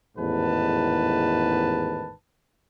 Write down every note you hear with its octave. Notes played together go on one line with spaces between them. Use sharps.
A1 E2 G#2 D#3 B4 A5